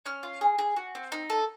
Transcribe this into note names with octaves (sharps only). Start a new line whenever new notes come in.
C#4 F6
F4
G#4
G#4
F#4
C4
D#4
A4